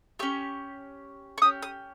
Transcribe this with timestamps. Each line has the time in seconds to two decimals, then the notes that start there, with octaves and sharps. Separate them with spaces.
0.19 C#4 G4 C#6
1.38 C#6
1.42 C#4 G4 D#6
1.63 D#6